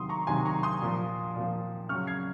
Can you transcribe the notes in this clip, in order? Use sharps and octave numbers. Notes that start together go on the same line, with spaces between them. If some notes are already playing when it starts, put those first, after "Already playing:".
Already playing: C3 D#3 F#3 C6 D#6
A#5 C#6
C3 D#3 F#3 G#5 C6
A#5 C#6
C6 D#6
A#2 F3
A#2 F3
C#3 F#3 C#6 F6
G#6 C7